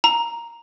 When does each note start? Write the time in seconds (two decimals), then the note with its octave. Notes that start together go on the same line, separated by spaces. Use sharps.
0.04 A#5